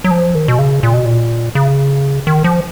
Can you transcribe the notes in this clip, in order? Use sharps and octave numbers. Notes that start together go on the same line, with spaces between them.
F#3
F3
D#3
B2
C#3
A#2
B2
A#2
C#3
D#3
F3